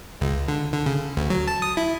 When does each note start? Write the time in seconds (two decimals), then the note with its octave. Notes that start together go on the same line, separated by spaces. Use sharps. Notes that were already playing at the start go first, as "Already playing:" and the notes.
0.21 C#2
0.48 D3
0.72 D3
0.86 C#3
1.17 D2
1.30 F#3
1.48 A5
1.62 D#6
1.77 E4